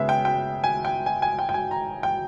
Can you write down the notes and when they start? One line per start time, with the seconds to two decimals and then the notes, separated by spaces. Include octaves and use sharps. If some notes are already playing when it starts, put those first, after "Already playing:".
Already playing: C#3 G#3 B3 E5
0.09 G5
0.25 G5
0.64 G#5
0.85 G5
1.06 G#5
1.22 G#5
1.39 G5
1.49 G5
1.54 G#5
1.71 A#5
2.03 G5